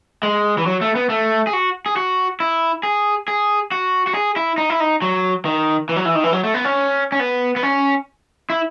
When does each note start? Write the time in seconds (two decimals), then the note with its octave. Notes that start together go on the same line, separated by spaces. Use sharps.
0.23 G#3
0.58 E3
0.66 F#3
0.81 A3
0.95 B3
1.10 A3
1.47 G#4
1.53 F#4
1.86 G#4
1.96 F#4
2.40 E4
2.83 G#4
3.28 G#4
3.72 F#4
4.07 F#4
4.15 G#4
4.36 E4
4.58 D#4
4.70 E4
4.80 D#4
5.02 F#3
5.45 D#3
5.89 E3
5.96 F#3
6.05 E3
6.15 D#3
6.24 E3
6.33 F#3
6.44 A3
6.54 B3
6.64 C#4
7.12 C#4
7.20 B3
7.56 B3
7.63 C#4
8.50 E4